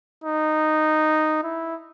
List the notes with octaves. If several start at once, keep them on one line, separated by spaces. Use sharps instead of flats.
D#4
E4